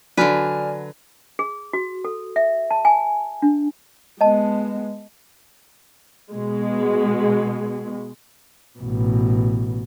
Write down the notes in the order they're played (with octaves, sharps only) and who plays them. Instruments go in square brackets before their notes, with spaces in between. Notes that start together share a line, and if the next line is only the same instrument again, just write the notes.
[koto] D3 B4 [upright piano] F#3 [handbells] D5 G#5 F6
[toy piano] G#4
F#4
A4
E5
A5
G#5
D4
[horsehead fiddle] G#3 B3 [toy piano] D#5 A5
[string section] B2 G#3
[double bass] A1 B2